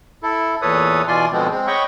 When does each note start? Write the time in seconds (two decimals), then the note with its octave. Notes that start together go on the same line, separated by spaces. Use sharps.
0.23 E4 A4
0.62 E2 A#2 A4 B4 C#5 D#6
1.08 B2 E3 F4 D5 G#5 C6
1.32 B2 D3 F3 G#3 B3 C4
1.51 G#3 C4
1.67 C#5 D#5 F#5 G5 B5 C#6